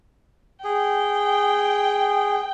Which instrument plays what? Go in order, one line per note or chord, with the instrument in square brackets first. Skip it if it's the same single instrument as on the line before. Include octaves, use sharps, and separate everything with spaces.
[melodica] G#4 [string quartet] G5